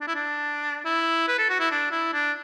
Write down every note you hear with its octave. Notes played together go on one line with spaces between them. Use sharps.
D4
E4
D4
E4
B4
A4
F#4
E4
D4
E4
D4